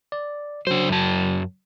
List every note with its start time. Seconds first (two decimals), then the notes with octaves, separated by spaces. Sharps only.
0.12 D5
0.67 C#3 F#3 D4 C5
0.89 F#2 A5